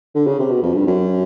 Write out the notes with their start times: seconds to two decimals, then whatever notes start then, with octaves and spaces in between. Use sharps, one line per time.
0.15 D3
0.27 C#3
0.39 C3
0.50 B2
0.63 F2
0.74 G2
0.87 F#2